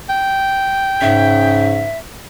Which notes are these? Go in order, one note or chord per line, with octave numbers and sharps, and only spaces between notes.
G5
G#2 C#3 E5